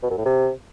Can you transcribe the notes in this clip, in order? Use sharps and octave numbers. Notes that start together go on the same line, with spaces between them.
B2
F#2
A2
C3